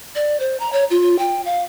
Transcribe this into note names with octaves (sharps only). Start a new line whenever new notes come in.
D5
C5
A#5
C#5
F4
G5
F5